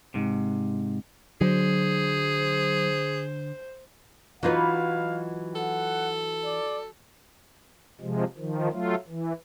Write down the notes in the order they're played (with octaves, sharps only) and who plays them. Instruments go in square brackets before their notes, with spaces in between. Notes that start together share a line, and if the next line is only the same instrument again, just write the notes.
[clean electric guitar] G#2 C3
[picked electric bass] D3 [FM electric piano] F#3 [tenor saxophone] G#4 [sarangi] C5
[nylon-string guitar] E3 F4 [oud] F#3 D#4 B4 [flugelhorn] F5
[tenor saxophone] A4 [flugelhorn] F#5
[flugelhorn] D5
[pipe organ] C3 F3 G#3
D#3 F3
F#3 A3 F4
E3